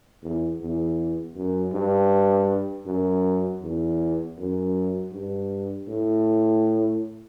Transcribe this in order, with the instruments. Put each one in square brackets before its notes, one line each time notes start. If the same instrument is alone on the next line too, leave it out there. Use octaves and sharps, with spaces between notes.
[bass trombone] E2
E2
F#2
G2
F#2
E2
F#2
G2
A2